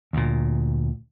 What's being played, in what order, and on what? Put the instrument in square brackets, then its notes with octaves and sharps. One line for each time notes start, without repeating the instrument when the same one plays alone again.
[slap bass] D2 A#2